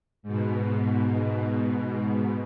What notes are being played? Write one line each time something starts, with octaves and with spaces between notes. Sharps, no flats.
G#2 B2